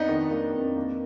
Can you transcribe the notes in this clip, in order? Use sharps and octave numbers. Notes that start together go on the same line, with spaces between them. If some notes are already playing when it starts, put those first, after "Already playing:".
Already playing: F2 B3 D4 D#4
D#3
A#3
F2
A#3